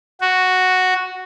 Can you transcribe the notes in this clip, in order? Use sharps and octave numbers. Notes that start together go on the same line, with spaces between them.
F#4